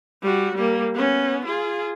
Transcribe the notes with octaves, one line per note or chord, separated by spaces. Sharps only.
G3 F#4
G3 A#3
B3 C#4
F4 G#4